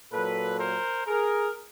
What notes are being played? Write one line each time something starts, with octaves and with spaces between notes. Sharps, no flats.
A#2 F#3 A4 B4
A#4 C5
G#4 A#4